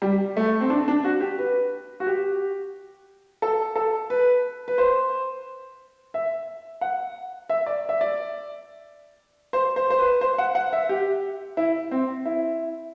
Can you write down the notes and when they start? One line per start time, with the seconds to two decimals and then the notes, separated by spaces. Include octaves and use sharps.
0.02 G3
0.37 A3
0.61 C4
0.70 D4
0.88 D4
1.04 F#4
1.21 G4
1.39 B4
2.00 F#4
2.07 G4
3.42 A4
3.76 A4
4.10 B4
4.68 B4
4.78 C5
6.14 E5
6.81 F#5
7.50 E5
7.66 D5
7.89 E5
8.01 D5
9.53 C5
9.76 C5
9.90 C5
9.99 B4
10.21 C5
10.38 F#5
10.55 F#5
10.73 E5
10.89 G4
11.57 E4
11.91 C4
12.26 E4